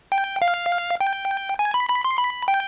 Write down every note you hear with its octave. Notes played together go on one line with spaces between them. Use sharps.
G5
F5
G5
G#5
B5
B5
C6
B5
G5